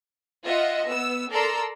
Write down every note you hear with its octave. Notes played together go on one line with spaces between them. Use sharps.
F4 D#5 E5 F#5
B3 E6
A4 A#4 D5 A#5 C6 E6